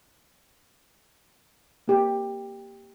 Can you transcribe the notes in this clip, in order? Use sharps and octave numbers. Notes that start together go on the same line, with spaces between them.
A#3 G4